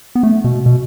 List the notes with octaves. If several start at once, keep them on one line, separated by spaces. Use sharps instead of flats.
B3
A3
B2
B2